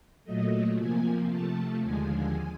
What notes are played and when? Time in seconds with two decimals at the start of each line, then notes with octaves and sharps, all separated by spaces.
0.24 A#2 F#3 A3 D#5
0.76 C3 F3 A#3 G#5
1.29 C3 F3 A3 A5
1.82 D#2 D3 F3 G#3 G#5